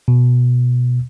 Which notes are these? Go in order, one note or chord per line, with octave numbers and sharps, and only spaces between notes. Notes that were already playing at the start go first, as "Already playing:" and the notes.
B2